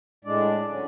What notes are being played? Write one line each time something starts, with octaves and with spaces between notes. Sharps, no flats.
A2 G#3 D4 D5
D3 F#3 C#4